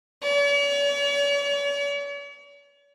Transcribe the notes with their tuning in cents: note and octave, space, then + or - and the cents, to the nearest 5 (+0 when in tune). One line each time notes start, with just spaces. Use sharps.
C#5 +45